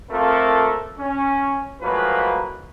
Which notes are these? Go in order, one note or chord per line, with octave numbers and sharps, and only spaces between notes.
A3 A#3 C4 F4 A4 A#4
C#4
A2 F3 F#3 G#3 A#3 B4